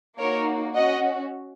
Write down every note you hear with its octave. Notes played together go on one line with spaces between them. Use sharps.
A#3 D#4 F#4 A#4 C#5
C#4 F#4 D#5 F#5